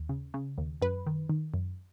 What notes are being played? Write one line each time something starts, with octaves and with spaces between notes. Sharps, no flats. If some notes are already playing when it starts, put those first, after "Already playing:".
Already playing: D#2
C#3
C#3
D#2
F#2 B4
D#3
D#3
F#2